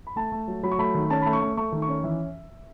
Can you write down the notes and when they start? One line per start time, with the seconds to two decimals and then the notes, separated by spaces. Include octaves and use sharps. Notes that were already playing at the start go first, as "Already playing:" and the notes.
0.07 B5
0.16 A3 A5
0.32 A3
0.48 F#3
0.63 F#3 B5
0.72 C#6
0.79 A3 B5
0.94 D#3
1.10 C#4 A5
1.22 A3 B5
1.33 C#6
1.41 A3
1.57 A3 C#6
1.72 D#3
1.82 C#6
1.88 C#4
2.04 E3 E5